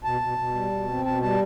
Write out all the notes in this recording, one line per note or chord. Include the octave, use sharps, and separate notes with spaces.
B2 A5
B2
B2
G3
B2
C4
B2 A5
G3 A5